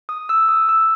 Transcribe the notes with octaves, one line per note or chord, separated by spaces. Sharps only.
D#6
E6
D#6
E6